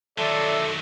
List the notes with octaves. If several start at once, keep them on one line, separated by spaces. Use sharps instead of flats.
D#3 F#3 A4 D5 E5 A5 C6 E6